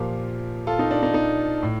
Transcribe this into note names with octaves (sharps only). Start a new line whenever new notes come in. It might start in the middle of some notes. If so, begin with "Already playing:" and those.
Already playing: A#2 F3 G4 A#4
F4 A4
D#4
D4
D#4
D#4
A2